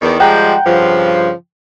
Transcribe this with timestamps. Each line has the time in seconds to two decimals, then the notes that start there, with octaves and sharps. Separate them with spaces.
0.02 E2 D#3
0.20 F3 G3 G#3 F#5 G5 A#5
0.66 G2 C#3 F3